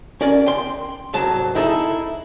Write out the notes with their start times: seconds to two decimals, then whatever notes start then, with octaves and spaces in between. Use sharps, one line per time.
0.21 C#4 A#4 D5
0.46 G5 C6
1.14 C2 G#2 F#3 A5
1.55 D#4 E4 G#4 A4